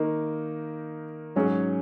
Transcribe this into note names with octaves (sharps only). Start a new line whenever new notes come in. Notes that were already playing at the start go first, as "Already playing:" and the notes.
Already playing: D#3 A#3 D#4
G#2 F#3 C#4 G#4